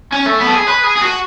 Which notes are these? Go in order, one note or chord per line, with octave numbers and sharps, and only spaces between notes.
C#4
A3
B3
A4
G#4
B4
G#4
G#4
F#4